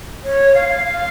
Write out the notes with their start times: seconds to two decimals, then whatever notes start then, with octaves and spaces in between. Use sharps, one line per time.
0.24 C#5
0.54 F5
0.69 F5
0.84 F5